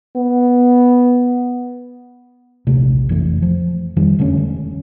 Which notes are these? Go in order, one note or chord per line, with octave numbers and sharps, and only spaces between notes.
B3
D#1 A#1 C3 A3
F1 E3 A3
F3
F2 D#3 G3
E1 D3 A3 C#4